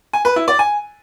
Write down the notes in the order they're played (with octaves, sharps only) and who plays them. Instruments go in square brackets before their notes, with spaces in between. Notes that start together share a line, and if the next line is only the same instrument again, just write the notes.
[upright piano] G#5
B4
E4
D5
G#5